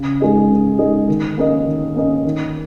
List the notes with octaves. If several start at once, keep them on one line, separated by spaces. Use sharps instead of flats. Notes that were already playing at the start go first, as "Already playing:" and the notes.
Already playing: C#3
G#3 D#4 G#4 D#5
C#3
G#3 D#4 G#4 D#5
D#3
A#3 C#4 A#4 D#5
D#3
A#3 C#4 A#4 D#5
D#3